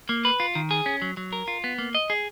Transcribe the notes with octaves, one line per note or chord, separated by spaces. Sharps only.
A#3
B4
F4
D#3
G#4
C#4
F#3
F#3
A#4
F4
B3
A#3
D#5
G#4